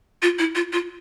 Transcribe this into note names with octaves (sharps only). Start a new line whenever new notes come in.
F4
E4
F4
F4